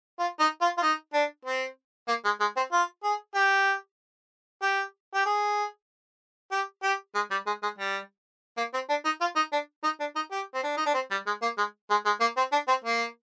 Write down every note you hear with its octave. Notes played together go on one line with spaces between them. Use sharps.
F4
D#4
F4
F4
D#4
D4
C4
A#3
G#3
G#3
C4
F4
G#4
G4
G4
G4
G#4
G4
G4
G#3
G3
G#3
G#3
G3
A#3
C4
D4
D#4
F4
D#4
D4
D#4
D4
D#4
G4
C4
D4
D#4
D4
C4
G3
G#3
A#3
G#3
G#3
G#3
A#3
C4
D4
C4
A#3